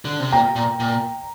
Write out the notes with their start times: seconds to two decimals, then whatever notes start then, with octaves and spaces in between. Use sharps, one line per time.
0.05 D3
0.20 C3
0.32 A#2 G5 A#5
0.56 A#2
0.80 A#2